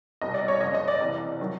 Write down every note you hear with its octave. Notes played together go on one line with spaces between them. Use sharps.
C2 B2 G3 D#5
D5
C#5
F#1 F2 C#3 D#5
D#5
D5
C2 C3 E3
D#3 F#3